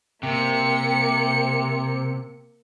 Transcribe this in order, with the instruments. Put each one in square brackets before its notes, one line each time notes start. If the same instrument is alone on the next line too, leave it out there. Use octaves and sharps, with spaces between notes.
[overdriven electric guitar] C3 [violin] A#3 C#7